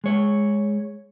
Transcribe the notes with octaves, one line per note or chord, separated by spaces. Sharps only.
G#3 C#5